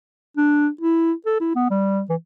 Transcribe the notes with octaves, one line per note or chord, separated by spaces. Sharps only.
D4
E4
A4
E4
B3
G3
E3